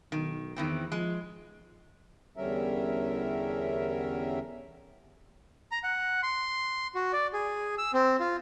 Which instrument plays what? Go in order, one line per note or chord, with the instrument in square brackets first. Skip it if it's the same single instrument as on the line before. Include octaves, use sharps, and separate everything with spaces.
[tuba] B1 [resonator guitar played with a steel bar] D#3
[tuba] E2 [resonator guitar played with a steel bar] D#3 E3 C4
[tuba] F3 [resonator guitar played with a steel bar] G#3
[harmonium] E2 D3 G3 C#4 A#4 E5
[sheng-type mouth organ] A#5
F#5
C6
F#4
D5
G#4
E6
C4
F4